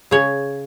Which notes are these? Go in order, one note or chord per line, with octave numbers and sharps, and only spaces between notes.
C#3 C#5